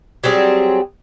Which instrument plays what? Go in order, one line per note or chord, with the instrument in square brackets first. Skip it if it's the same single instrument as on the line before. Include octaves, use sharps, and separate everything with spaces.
[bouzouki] F#3 G3 C4 G#4